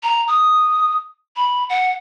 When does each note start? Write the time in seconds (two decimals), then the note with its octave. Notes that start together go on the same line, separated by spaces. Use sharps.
0.03 A#5
0.28 D#6
1.36 B5
1.70 F#5